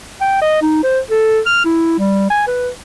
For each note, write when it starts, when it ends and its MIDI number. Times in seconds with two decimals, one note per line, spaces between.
0.21 0.41 79
0.42 0.61 75
0.62 0.82 63
0.83 1.00 72
1.11 1.40 69
1.46 1.65 89
1.65 1.94 64
1.99 2.28 55
2.30 2.44 80
2.47 2.69 71